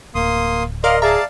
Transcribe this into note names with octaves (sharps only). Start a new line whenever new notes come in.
D1 A#3 C6 D#6
A#4 D5 D#5 F5 C6 F6
G#4 D5 E5 F5 A5 A#5